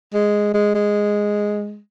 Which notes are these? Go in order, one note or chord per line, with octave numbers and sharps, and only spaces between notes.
G#3
G#3
G#3